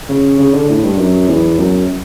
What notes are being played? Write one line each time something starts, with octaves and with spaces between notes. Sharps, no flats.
C#3
C#3
D3
A2
G2
F#2
E2
F#2